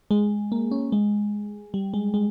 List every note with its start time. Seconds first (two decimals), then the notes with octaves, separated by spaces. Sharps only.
0.11 G#3
0.52 A#3
0.71 C#4
0.92 G#3
1.74 G3
1.94 G#3
2.14 G#3